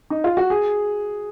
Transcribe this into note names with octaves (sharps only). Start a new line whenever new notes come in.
D#4
F4
F#4
G#4